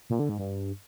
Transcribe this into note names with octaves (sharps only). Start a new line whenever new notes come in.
A#2
D3
G#2
G2